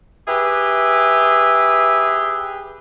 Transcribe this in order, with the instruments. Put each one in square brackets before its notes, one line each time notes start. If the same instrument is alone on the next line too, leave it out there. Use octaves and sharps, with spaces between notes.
[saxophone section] G4 G#4 B4 E5